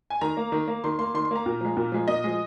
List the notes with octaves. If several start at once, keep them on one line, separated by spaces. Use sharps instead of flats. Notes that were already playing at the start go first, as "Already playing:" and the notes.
G#5
D#3 A#5
A#3
D#3
A#3
D#3 C6
A#3 C6
D#3 C6
C6
A#3 A#5
A#2
F3 G#3
A#2
F3 G#3
A#2 D#5
F3 G#3